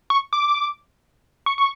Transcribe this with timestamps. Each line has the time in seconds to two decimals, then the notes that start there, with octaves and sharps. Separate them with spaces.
0.10 C#6
0.33 D6
1.46 C#6
1.58 C#6